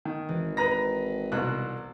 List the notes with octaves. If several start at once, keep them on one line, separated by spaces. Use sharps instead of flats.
D#3
G#1 E3
B4 A#5 A#6
C2 B2 E6 F#6